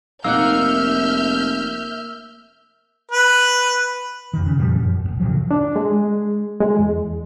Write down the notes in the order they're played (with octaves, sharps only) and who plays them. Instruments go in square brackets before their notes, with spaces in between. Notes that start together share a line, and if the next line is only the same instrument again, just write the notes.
[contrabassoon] F1 [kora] A#3 D#4 F#5 [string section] E5 F6 G6 [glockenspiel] E6
[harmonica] B4
[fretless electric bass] F2 D#3
C#3
F2 A#2 F3 G3
F#2
D#1 D#2
A2 C#3 F3 F#3
[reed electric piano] D4
G#3
G#3
E2